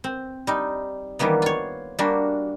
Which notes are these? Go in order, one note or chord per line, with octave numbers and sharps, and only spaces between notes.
C4
G3 D#4
D#3 E3 G3 A#3 B3
F4 C#5
G3 A#3 D4 F#4